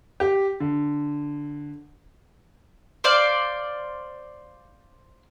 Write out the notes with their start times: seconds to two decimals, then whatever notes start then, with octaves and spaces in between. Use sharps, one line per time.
0.20 G4
0.60 D3
3.04 C5 D5 F5